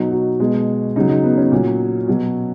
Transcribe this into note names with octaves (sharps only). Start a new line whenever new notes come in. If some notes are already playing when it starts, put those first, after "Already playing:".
Already playing: B2 F#3 D#4
F#4
B2 G#3
C#3 F#3 D#4
D#4
B3
C#4
A#2 F#3
B2 F#3